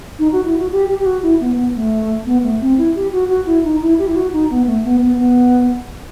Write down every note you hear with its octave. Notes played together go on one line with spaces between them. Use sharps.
D#4
F#4
E4
F#4
G4
G4
G4
F#4
E4
B3
B3
A3
B3
A3
C4
E4
G4
F#4
F#4
E4
D#4
E4
G4
E4
F#4
D#4
B3
A3
B3
B3
B3